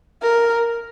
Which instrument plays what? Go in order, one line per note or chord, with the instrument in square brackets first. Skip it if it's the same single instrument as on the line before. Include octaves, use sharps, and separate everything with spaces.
[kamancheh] A#4